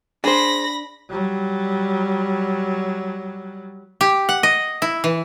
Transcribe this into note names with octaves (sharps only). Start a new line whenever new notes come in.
D4 G#4 C5 B5 A#6
F#3 G3
G4
F#5
D#5
E4
E3